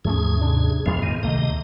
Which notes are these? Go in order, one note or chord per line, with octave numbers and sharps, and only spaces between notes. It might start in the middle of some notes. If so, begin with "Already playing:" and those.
D#2 G#2 F3 A3 C#4 G#4
C3 D4
F2 A2 F3 G#3 B3
F2 D#3
D2 C3 D#3 A3 A#3 D#5